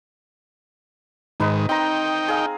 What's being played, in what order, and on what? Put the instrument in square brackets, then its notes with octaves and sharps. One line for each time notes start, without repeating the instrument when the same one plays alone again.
[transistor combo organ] G#2 D#3 [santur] D#4 B4 D#5
[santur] C4 A#5 [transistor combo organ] D#4 G5
[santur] G#4 F5